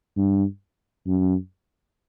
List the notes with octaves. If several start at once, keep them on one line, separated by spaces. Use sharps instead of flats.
G2
F#2